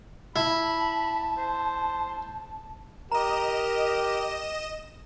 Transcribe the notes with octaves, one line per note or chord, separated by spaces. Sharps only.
E4 A5 B5
C5
G4 A#4 D#5 A#5 E7